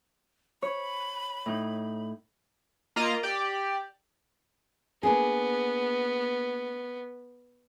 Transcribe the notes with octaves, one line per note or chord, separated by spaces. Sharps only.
C#5 B5
A2 D#4 G6
A#3 F4 D#5 A#5
G4 D5
A#3 B3 D4 G#4